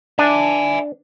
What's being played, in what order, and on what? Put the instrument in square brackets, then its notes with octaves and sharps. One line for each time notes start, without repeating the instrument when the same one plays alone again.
[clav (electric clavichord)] D4 [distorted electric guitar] E5 G#5